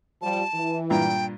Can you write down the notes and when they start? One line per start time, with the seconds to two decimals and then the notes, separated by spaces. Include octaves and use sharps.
0.22 F3 G3 A5
0.54 E3
0.90 G2 A#2 G5 A#5